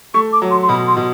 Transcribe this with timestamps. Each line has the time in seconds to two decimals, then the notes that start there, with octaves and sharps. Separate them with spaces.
0.14 A3 C#6
0.33 D6
0.42 F#3
0.51 C6
0.62 C6
0.69 B2 B5
0.87 C6
0.97 B2